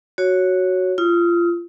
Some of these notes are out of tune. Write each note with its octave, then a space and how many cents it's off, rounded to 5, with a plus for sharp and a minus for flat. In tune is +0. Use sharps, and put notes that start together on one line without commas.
F#4 +0 C#5 +0
F4 -25 D#6 +35